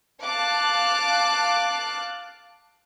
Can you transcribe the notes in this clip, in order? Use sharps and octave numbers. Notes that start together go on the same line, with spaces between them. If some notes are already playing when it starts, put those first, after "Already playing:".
F5 A5 D6 F#6